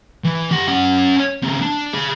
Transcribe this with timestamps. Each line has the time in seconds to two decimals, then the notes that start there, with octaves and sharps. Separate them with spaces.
0.24 E3
0.51 G4 F#5
0.68 C#4 F#5
1.43 C#3 C4
1.62 D4
1.93 G#4 F5